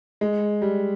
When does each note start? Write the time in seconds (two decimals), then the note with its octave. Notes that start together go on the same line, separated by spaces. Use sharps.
0.21 G#3
0.62 G3